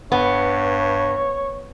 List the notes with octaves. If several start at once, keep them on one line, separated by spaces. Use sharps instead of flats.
G2 B3 C#5